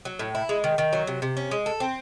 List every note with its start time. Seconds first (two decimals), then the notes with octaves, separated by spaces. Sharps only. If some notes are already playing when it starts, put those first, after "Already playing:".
0.05 F#3
0.19 A2
0.35 E4
0.49 G#3
0.64 D#3
0.78 D#3
0.93 F#3
1.07 C3
1.22 C3
1.37 C#4
1.51 G#3
1.66 A4
1.80 C4